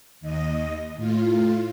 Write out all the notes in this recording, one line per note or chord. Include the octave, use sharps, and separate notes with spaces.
D#2 D#5
A2 F4